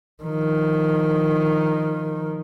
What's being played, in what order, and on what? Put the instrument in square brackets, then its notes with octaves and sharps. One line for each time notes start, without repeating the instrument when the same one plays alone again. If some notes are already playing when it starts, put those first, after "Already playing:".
[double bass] D#3 F3